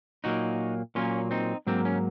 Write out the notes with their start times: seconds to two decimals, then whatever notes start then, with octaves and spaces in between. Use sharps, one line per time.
0.24 A#2 F#3 A#3 D#4 F#4
0.95 A#2 F#3 A#3 C#4 F4
1.31 C4 D#4
1.67 G#2 F#3 A#3 C4
1.85 C#4